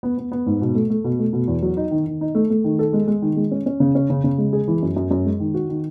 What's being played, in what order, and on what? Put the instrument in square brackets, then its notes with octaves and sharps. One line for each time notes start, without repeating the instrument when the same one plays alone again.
[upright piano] B3
B3
B3
G#2
B2
A3
A3
B2
A3
B2
E2
F#3
D#4
D#3
D#3
D#4
A3
A3
D#3
A4
G#3
G#3
D#3
G#3
C#4
C#4
C#3
C#4
C#3
C#3
G#3
G#4
E3
F#2
F#2
F#2
G#3
D#3
F#4
D#3